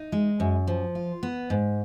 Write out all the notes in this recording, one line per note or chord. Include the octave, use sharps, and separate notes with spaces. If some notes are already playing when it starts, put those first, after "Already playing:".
Already playing: D#4
G#3
F#2
F3
F4
B3
G#2